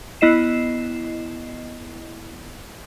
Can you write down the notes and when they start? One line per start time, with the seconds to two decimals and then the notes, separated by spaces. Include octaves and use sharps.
0.21 B3 E4 D#5 C7 E7